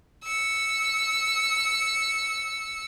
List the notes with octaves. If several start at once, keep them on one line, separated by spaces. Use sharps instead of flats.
E6 C#7